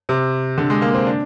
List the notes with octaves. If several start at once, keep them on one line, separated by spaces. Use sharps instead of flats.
C3
D3
G#3
A#3
C4
D4